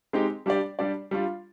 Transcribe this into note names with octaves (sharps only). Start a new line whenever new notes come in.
G#3 C4 D#4 G4
G3 D4 G4 D5
G3 D4 G4 D5
G3 D4 F4